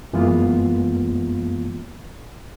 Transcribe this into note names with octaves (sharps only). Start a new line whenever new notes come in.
F#2 E3 G#3 A#3 B3 F4